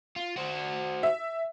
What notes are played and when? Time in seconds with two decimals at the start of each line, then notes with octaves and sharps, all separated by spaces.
0.16 F4
0.36 F#4 C5
1.03 E5